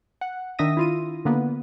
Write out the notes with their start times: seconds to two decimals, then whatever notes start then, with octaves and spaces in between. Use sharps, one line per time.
0.21 F#5
0.59 D#3 D4 E5 D#6 A#6 D#7
0.77 E4 F4 D#7
1.25 D3 A#3 B3